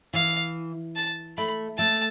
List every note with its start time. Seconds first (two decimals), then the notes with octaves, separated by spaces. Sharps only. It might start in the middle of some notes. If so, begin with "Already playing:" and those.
0.13 E3 F5
0.96 A5
1.38 A3 B5
1.78 A3 A5